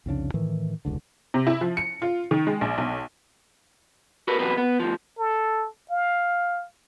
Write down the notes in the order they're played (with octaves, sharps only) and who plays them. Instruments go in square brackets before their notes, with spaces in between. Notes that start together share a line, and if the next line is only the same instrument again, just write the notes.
[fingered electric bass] C2 F2 C#3 D4
A2 D#3 E3
E1 C#2 D3
[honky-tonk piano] C3
E4
F3
C#7
F4
D#3
G#3
A#1
B1
[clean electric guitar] F#4 A#4 B4
E2 C3 F#3 F#4 B4
B3
D2 F3
[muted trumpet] A4
F5